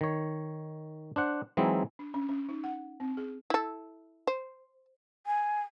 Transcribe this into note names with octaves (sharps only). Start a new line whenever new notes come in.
D#3 C#5
D4 C5 F#5
E3 F#3 G#3 C4 D#4 E4
D4
C#4
C#4
D#4
F#5
C4
G#4
E4 A4
C5
G#5